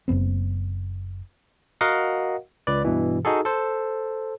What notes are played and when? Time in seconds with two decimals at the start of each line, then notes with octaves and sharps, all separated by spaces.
0.08 F#1 G#2 B3 C4
1.81 F#4 A#4 D#5 F5 F#5
2.67 C#2 B4 D5
2.84 G2 B2 E3
3.25 D#4 F#4 G#4 A4
3.45 A4 C5